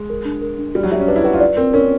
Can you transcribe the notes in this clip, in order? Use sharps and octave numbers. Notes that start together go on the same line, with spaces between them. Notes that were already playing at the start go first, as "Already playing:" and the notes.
Already playing: G#3
A#4
D4
A#4
D4
G3 F#4
F#3
G3 E5
C#4
D4 B4
E4
F#4 B4
F4
D5
C4 A#4
C#4 A#4